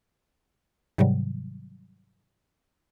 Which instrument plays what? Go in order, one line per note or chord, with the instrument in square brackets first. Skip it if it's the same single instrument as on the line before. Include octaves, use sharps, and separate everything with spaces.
[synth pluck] G#2 C3 D#3 F#3 G3